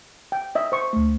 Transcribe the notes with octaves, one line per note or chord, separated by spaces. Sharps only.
G5
D#5 E5
C5 C#6
D2 A3